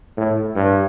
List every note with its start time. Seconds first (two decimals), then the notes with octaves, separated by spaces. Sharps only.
0.17 A2
0.56 G2